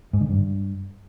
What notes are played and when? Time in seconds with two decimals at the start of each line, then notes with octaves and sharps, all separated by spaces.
0.13 G#2
0.21 D3
0.29 G2